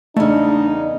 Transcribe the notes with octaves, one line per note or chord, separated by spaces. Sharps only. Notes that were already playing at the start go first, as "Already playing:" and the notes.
E2 C#3 A3 D4 D#4